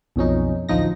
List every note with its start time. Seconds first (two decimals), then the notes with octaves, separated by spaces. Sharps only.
0.16 B1 F2 C#4 D#4
0.69 A1 D2 F3 D#4 A#6